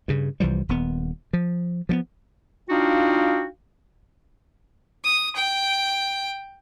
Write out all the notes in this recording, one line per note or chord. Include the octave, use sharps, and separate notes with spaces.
G2 C#3
C2 E3 F3 G3
D#1 B3
F3
F3 A3 B3
D4 D#4 F4 F#4 F5 G5
D#6
G5